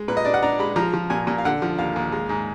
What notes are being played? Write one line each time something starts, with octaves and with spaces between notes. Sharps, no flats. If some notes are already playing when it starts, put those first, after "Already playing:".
Already playing: G#3
A#2 B4
D#5
D4 D5
F#5
D4 A#5
G#3 B5
F3 A#5
F3
A#2 G#5
A#2
F5
D3 F#5
F3
D#2 F5
D#2
G#3
G#2